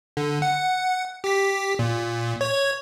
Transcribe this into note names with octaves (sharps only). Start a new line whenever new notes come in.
D3
F#5
G4 B6
A#2
C#5 G#6